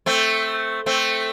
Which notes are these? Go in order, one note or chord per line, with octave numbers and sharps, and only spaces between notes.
A3 C4
A3 C4